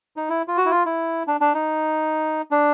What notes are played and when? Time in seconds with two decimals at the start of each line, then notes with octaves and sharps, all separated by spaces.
0.16 D#4
0.30 E4
0.48 F4
0.57 F#4
0.66 E4
0.71 F4
0.86 E4
1.27 D4
1.41 D4
1.54 D#4
2.51 D4